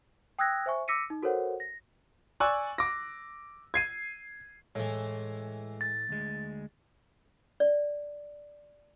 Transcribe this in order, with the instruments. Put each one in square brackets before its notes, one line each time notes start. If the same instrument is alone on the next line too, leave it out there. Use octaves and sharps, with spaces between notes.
[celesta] G5 D#6 E6 F#6 G#6 A#6
C5 E5 G#5 C#6
D6 E6 A#6 B6 C#7 D#7
D#4
F#4 A4 A#4 C5 C#5 F#5
A#6
[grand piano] D5 G#5 C#6 E6 F#6
D6 A#6
G#6 C7 D#7
[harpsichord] A2 E3 [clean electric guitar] G#3
[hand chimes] A6
[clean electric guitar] D2 G#3
[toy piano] D5